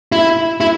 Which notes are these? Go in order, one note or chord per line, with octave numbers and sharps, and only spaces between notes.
E4
E4